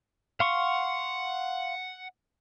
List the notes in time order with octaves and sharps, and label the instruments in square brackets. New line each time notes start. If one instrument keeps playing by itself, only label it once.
[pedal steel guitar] F5 C6 C#6 [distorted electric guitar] F#5